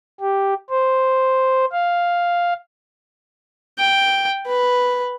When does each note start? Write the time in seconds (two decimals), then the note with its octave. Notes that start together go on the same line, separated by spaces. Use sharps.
0.20 G4
0.70 C5
1.72 F5
3.79 G5
4.47 B4